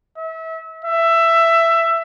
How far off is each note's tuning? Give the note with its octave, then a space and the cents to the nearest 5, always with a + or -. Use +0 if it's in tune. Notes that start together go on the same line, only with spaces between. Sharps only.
E5 -30
E5 +15